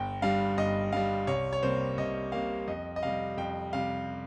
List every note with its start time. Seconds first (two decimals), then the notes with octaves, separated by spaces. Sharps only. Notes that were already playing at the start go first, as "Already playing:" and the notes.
Already playing: G1 G5
0.22 G2 G3 F5
0.57 G1 D#5
0.92 G2 G3 F5
1.27 C2 C#5
1.53 C#5
1.62 C3 G3 A#3 C5
1.97 C2 D#5
2.32 C3 G3 A#3 F5
2.68 F2 D#5
2.96 D#5
3.03 C3 G3 F5
3.37 F2 G5
3.73 C3 G3 F5